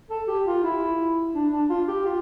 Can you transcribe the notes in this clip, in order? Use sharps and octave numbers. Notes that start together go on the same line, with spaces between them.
A4
G4
F4
E4
D4
D4
F4
G4
F4